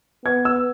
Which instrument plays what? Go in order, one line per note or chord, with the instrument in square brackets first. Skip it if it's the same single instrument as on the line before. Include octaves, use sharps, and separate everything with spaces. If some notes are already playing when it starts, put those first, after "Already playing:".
[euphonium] B3 [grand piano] G#6
[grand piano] E6